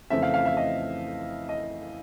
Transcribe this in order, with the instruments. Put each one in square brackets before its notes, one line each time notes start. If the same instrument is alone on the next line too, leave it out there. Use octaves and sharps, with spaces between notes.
[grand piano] F2 C#3 E3 A3 C4 E5
F5
F5
E5
D#5
D#5